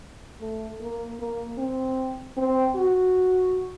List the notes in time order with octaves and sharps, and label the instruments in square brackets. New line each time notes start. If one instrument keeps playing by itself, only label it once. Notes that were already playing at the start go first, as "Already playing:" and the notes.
[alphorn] A3
A#3
A#3
C4
C4
F#4